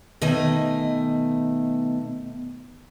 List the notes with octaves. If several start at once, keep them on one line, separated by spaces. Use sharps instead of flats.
B2 D#3 A3 D#5 G#5